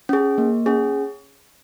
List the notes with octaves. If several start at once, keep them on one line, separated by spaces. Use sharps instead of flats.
C#4 G#4
A#3
C#4 G#4